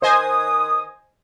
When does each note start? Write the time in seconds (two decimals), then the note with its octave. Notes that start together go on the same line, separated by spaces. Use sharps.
0.02 D#3 B4 C5 D#5 G#5 D#6